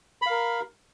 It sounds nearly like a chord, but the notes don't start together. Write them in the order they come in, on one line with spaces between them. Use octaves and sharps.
B5 F5 A#4